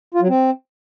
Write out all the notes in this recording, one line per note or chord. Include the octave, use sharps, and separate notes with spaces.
F4
F#3
C4